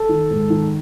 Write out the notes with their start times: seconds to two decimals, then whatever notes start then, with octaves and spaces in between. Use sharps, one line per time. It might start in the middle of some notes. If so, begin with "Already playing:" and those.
Already playing: A4
0.09 D#3
0.30 G#2
0.50 D#3